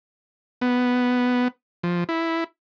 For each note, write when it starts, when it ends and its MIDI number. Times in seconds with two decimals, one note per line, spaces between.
0.62 1.48 59
1.83 2.04 53
2.09 2.44 64